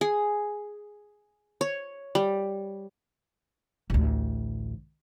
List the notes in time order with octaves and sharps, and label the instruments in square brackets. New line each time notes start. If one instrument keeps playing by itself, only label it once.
[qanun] G#4
C#5
G3
[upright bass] A1 D2